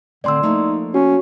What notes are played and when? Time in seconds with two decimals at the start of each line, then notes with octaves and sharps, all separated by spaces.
0.24 A2 D3 C4 D5 C6 E6
0.43 F3 A3 A#3 D#4
0.94 C#4 F#4 C#5